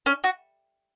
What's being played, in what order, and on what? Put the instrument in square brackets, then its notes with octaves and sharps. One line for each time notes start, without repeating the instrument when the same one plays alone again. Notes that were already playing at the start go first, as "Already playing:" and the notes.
[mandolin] C#4
F#4